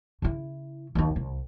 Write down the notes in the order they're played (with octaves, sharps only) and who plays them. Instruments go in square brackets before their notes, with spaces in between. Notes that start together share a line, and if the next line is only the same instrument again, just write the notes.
[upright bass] C#3 E4
D#2 D#4
C2